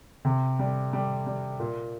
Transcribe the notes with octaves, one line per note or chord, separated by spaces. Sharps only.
C3
G3
G3
G3
A#2